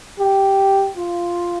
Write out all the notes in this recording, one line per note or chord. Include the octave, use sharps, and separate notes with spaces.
G4
F4